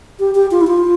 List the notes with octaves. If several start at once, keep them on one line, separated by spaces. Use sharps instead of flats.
G4
G4
F4
E4
F4